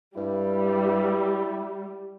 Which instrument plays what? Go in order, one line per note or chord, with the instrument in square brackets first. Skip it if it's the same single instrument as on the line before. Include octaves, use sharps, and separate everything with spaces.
[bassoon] G2 [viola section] G3 [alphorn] E4